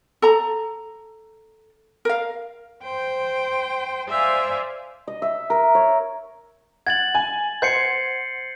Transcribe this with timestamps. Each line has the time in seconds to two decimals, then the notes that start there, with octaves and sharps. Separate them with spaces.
0.22 A4 A#5
2.05 A#4 F5
2.82 C5 G5
4.08 C5 D5 E5 F5 G#5
5.07 D#5
5.22 E5
5.50 A#4
5.75 C#5
6.87 F#5 G#6 A6 F#7
7.15 G#5
7.62 C5 F#5 G6 G#6 C7 C#7